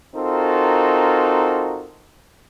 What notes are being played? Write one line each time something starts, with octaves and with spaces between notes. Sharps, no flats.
C4 D#4 F4 F#4 A4 A#4